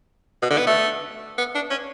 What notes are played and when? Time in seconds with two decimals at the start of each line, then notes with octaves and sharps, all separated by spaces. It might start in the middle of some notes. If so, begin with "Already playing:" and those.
0.42 B2
0.50 D3
0.58 B3
0.67 A3
1.38 B3
1.55 D4
1.71 C#4